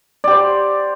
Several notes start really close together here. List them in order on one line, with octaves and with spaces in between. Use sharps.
D5 G4 C5